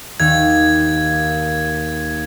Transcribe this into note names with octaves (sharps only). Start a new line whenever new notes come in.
D#2 G#6